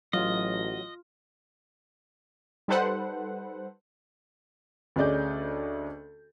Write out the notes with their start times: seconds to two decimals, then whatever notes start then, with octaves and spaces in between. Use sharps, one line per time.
0.13 A1 F#3 F4 D#5
2.68 G3 D#4 A4 B4 C5 F#5
4.96 D2 C#4 G#4 D5 D#5 G6